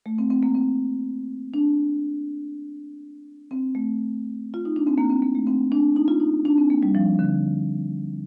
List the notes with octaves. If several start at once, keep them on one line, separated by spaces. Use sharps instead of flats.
A3
C4
C4
A#3
C4
D4
C4
A3
F4
D#4
D4
C4
A#3
C4
A#3
A3
C4
D4
D#4
F4
D#4
D4
C4
A#3
G3
F3
D3